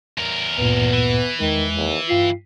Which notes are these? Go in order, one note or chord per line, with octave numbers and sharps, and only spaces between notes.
E2 A#4
D2 G2 A#2 B3
E3
E2 D#3 G#3
D#2
G2 F4 G5 C7